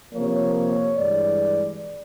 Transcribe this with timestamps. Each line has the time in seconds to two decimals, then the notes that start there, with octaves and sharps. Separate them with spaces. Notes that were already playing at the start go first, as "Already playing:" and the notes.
0.13 C3 F3 A#3 C#5
0.97 G2 E3 G#3 D5